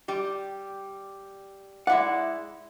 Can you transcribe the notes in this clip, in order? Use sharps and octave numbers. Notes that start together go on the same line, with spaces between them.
G3 G4
G#3 E4 D5 F#5